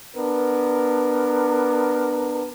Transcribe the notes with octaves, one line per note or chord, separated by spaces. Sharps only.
B3 D4 A#4